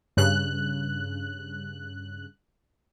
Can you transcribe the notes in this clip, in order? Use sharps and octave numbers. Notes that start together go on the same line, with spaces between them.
G2 C#3 F#6